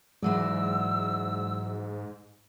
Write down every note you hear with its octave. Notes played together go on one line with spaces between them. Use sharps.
G#2 E3 F#3 G#3 D5 E6